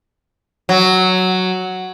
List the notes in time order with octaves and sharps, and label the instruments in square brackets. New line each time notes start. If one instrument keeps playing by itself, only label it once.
[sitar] F#3